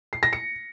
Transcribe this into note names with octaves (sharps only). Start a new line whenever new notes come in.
C7
A#6
C#7